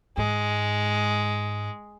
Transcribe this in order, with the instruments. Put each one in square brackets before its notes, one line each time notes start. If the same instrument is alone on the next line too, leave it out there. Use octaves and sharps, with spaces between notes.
[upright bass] G#2 [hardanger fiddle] G#3